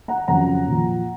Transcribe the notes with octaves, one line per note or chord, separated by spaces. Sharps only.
F#5 A#5
F2 C#3 F#3 F#5 A#5
A#2 F3